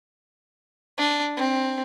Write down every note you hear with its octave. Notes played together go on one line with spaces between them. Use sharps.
D4
C4